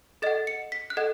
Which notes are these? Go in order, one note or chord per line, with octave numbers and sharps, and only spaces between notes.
A4 D#5 F#5 A6
C#7
B6
F#6
A4 D#5 F#5 G#6